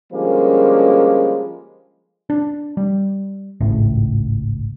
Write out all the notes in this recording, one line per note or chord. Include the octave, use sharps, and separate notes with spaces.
D3 F3 G3 G#3 A#3 C#4
D4
G3
G#1 C#2 A2